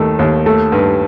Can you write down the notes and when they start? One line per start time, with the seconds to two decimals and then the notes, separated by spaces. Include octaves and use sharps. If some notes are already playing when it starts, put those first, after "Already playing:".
Already playing: D#2 D#3 A3
0.19 D#2
0.46 A3
0.72 G2